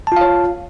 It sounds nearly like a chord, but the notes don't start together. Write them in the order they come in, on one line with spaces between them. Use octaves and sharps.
A5 F4 F5 C#5